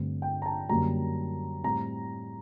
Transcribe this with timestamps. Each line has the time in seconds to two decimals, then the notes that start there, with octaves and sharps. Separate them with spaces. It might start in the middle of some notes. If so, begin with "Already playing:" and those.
Already playing: G2 D3 A3 C4
0.22 G5
0.42 A#5
0.46 A5
0.69 F#2 D3 G3 A#3 A#5
1.64 A2 G3 C4 A#5